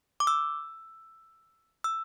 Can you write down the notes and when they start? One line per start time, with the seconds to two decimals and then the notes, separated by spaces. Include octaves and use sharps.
0.20 D6
0.27 E6
1.84 E6